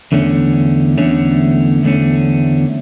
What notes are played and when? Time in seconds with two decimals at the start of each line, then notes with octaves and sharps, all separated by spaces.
0.12 E2 D3 A3 C#4
0.98 E2 D3 A3 C#4
1.83 E2 D3 A3 C#4